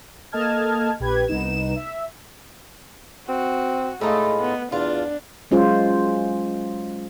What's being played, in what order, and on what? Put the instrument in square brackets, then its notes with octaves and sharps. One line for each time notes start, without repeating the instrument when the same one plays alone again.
[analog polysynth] A#3 A4 D#5 A5 F6 G#6
A#1 G4 B4 G#6
C2 B3 D#4 E7
E5
[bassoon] C4 [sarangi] F#4
[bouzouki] A2 D#4 F4 [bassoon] G#3 [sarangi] A3
[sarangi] B3
[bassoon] E2 [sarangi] D4 [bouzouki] F4
[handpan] F#3 G#3 C#4 F4 C5